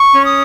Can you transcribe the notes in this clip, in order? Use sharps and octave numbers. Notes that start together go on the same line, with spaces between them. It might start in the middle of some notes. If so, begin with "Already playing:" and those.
Already playing: C#6
C#4
D#6